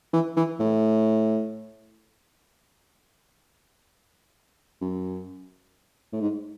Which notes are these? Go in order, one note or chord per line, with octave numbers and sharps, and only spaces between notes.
E3
E3
A2
F#2
A2
G#2